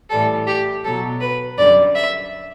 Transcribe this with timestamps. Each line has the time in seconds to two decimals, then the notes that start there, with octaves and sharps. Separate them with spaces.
0.09 A2 E3 G3 A4
0.46 G4
0.83 B2 F#3 A4
1.20 B4
1.57 F#2 D3 G3 D5
1.95 E5